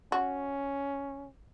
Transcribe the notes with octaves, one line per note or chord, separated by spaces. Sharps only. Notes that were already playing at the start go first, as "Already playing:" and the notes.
C#4 F#4